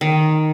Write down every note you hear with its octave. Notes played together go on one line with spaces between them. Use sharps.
D#3